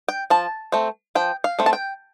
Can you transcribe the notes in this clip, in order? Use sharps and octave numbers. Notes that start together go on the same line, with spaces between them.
G5
F3 A5
A3 C4
F3 G5
F5
A3 C4
A5
G5